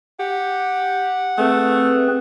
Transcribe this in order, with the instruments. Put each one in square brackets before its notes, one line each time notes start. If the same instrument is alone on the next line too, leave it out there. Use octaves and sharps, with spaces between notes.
[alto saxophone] G4 [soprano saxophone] F#5
[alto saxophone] A3 [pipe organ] C4 G#4 B4